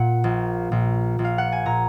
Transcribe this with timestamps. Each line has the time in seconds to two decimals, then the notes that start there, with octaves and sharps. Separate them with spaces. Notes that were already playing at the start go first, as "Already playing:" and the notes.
Already playing: A#2 F#5
0.24 A#1
0.72 A#1
1.19 A#1
1.24 F5
1.38 F#5
1.52 G#5
1.66 A#2 A#5